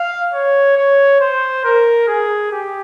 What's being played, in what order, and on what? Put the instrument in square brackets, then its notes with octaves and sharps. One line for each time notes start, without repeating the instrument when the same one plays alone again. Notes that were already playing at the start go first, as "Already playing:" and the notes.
Already playing: [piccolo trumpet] F5
C#5
C#5
C5
A#4
G#4
G4